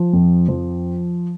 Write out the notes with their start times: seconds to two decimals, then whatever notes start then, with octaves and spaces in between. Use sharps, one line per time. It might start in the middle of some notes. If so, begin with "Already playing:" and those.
Already playing: F3
0.13 F2
0.48 F3